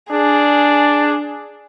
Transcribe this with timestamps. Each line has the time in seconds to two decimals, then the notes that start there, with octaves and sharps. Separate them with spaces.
0.10 D4 G#4